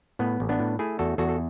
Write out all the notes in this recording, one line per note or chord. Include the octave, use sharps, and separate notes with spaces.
A2 B3
A1
B3 D4
A2
A3 E4 G#4
E2 F#4 A4
E2 F#4 A4
A4